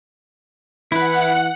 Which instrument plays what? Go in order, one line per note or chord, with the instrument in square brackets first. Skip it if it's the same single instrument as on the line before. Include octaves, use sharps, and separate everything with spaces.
[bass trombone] E3 [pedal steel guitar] E4 B4 [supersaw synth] F#5